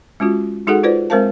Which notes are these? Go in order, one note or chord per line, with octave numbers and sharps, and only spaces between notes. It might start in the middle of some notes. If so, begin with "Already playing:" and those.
G#3 C#4 F4 F#4
G#3 D#4 F#4 G#4 A4 F#5
F4 B4 C5 D5
G#3 C4 A#4 C5 F5 A5